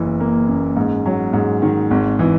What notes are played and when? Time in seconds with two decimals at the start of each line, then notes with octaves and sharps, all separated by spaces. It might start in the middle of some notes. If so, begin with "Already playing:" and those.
Already playing: F#1 E3
0.20 A#3
0.48 F#2
0.77 G#2
1.06 F#3
1.33 G#2
1.62 D#3
1.91 G#1
2.19 E3